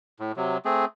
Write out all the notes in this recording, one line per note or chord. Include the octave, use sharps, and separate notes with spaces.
A2
C3 F#3
A3 C4 G#4